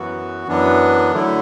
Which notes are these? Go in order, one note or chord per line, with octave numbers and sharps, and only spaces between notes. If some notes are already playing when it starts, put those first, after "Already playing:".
Already playing: F#2 E3 B3 F#4
F#2 E3 B3 D4
D3 F#3 A3 E4